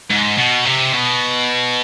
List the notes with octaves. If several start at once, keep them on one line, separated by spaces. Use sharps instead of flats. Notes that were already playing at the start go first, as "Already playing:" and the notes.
G#2
B2
C3
B2